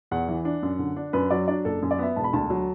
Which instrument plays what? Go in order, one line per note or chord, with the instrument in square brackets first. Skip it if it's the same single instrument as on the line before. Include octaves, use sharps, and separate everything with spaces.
[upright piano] E2 F#5
E3
D4
F#2
D3
D4
F#2 B4
F#3 D5
D4 D5
F#1 A4
F#2
D5
B3 E5
E1 A5
B5
D2 A5
F#3